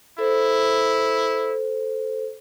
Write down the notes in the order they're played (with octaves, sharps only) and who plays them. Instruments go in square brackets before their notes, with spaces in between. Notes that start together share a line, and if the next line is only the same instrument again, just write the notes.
[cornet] E4 [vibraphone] A4 C5